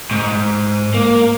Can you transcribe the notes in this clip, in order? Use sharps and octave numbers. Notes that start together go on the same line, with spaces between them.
G#2
A#3